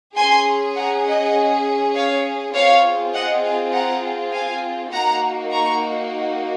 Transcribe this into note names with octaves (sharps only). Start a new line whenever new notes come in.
C#4 G#4 G#5 C6
F#5 A#5
D#5 F#5
C#5 F5
C4 F4 G#4 C#5 F5
D#5 F#5
F5 G#5
F#5 A#5
F5 G#5
A#3 D#4 F#4 F#5 A#5
A#5 C#6